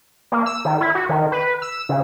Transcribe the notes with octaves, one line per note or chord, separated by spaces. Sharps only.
A#3
E6
D#3
E4
F#4
D#3
B4
E6
C#3